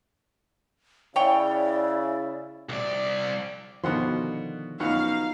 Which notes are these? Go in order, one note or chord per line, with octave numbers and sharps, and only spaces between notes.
C#3 E4 C#5 D5 G5
C2 D5
B2 D3 D#3 F3 F#5 C6
F#2 B3 D#4 F4 F5 F#5